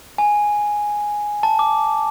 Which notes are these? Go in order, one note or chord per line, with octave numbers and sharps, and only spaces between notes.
G#5
A5
D6